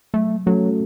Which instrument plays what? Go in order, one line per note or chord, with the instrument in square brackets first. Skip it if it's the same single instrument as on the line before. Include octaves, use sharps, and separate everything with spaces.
[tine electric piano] F#3 [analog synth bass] A3
[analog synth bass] F#3 [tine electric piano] A3 C#4 F#4 A4